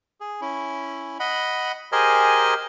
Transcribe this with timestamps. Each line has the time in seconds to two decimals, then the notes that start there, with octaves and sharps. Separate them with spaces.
0.20 G#4
0.41 C#4 E4
1.20 D#5 F#5 B5
1.92 G4 G#4 A#4 C5 D#5 G#5